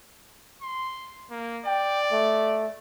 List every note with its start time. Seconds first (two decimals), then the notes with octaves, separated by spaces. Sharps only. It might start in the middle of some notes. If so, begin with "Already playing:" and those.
0.62 C6
1.30 A#3
1.66 D5 G5
2.12 A3